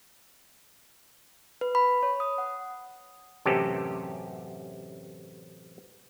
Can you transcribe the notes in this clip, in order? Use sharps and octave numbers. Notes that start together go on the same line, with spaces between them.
B4
B5
C#5
D#6
F#5
A1 F#2 C3 C#4 G4 A4